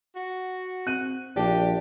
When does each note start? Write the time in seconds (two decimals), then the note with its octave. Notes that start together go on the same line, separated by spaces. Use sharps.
0.16 F#4
0.87 C4 F#6 D#7
1.36 A#1 D4 G4